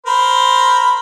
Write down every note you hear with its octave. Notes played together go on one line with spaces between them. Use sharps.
A#4 C5 B5